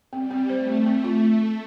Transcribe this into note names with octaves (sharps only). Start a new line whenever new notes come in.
G3 C4
C4
A3 C5
C4
A3 C4
F4